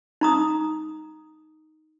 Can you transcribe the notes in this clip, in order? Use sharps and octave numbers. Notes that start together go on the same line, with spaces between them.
D#4 A#5 D#6